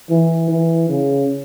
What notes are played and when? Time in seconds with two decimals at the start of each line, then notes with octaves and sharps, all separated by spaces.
0.10 E3
0.50 E3
0.89 C#3